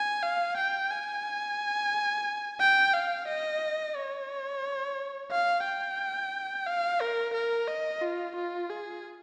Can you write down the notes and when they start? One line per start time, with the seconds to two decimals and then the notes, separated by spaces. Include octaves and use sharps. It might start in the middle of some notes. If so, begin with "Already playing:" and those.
Already playing: G#5
0.23 F5
0.57 G5
0.91 G#5
2.60 G5
2.93 F5
3.28 D#5
3.96 C#5
5.31 F5
5.65 G5
6.66 F5
7.01 A#4
7.34 A#4
7.68 D#5
8.02 F4
8.36 F4
8.71 G#4